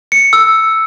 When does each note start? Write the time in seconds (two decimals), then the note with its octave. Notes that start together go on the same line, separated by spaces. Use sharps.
0.12 C#7
0.33 E6